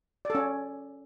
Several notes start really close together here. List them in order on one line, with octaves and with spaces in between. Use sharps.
D5 A4 C#4